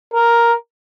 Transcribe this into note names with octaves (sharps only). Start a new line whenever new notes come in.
A#4